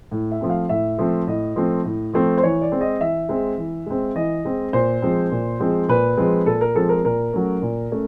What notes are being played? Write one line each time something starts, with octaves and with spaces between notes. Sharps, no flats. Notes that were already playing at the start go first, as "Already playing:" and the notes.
A2
E5
F3 A3 C4
F5
A2 E5
F3 A3 C4
A2 D#5
F3 A3 C4
A2
F3 A3 C4
C5
E3 C#5
D5
G#3 C4
D#5
E3 E5
G#3 C4
E3
G#3 C4
E3 D#5
G#3 C4
A#2 C5
F3 G#3 C4
A#2
F3 G#3 C4
A#2 B4
F3 G#3 C4
A#2 A4
A#4
F3 G#3 C4 A4
A#4
A#2 A#4
F#3 A3 C#4
A#2
A3 C#4